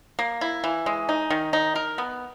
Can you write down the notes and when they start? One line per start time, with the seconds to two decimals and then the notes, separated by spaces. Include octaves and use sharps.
0.19 A#3
0.41 E4
0.64 E3
0.86 G#3
1.09 D#4
1.30 D#3
1.53 D#4
1.75 A#4
1.98 B3